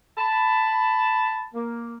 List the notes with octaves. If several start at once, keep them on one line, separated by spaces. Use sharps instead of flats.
A5 B5
A#3